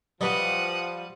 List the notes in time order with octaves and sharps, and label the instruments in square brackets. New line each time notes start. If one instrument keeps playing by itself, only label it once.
[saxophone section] F3 [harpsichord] G3 [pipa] F#4 B4 D#5 [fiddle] F#5 D#6